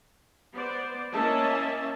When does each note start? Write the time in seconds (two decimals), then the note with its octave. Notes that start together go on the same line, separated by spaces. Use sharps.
0.54 B3 C5 D5
1.12 A#3 C#4 E4 D#5 E5 A5